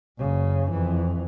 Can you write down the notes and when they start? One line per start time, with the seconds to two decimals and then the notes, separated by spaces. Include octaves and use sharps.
0.19 F#1 C#3
0.71 F2 E3